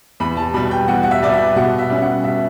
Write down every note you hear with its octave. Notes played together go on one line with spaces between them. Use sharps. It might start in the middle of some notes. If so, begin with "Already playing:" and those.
E2 B5
A5
B2 G3 B5
G5
E2 F#5
F#5
E5
B2 G3 D5
E5
B2 F#5
E5
G3 C#4
F#5
B2 E5